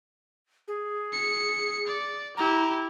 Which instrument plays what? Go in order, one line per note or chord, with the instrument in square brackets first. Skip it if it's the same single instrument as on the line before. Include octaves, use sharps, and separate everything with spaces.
[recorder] G#4
[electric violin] C#7
D5
[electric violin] E4 G4 [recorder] A#5